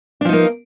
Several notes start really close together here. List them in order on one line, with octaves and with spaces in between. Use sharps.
D4 F3 D#4 A#3